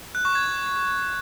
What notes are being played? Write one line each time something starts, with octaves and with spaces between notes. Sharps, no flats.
F#6
C#6
G#6